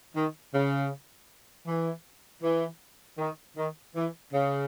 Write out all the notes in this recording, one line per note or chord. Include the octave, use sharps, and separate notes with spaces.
D#3
C#3
E3
E3
D#3
D#3
E3
C#3